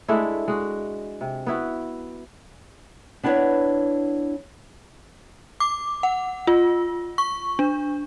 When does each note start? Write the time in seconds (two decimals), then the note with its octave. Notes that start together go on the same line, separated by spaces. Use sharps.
0.08 G#3 A3 D4 E4
0.48 G#3 F#4
1.21 C3
1.47 B3 E4 F#4
3.23 B3 D4 E4 B4 C#5 F#5
5.60 D6
6.03 F#5
6.47 F4
7.18 C#6
7.59 D4